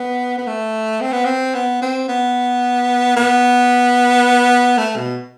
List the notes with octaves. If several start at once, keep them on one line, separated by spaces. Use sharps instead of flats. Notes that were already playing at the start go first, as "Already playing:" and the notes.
Already playing: B3
B3
A3
C4
B3
C4
B3
C4
B3
B3
A3
B2